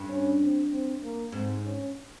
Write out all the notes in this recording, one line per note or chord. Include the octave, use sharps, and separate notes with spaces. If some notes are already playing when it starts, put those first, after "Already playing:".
Already playing: G2
C#4
C4
C4
A#3
G#2 C4
C#4